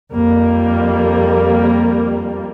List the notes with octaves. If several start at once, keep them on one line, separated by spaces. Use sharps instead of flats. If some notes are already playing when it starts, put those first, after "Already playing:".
F2 G3 A#3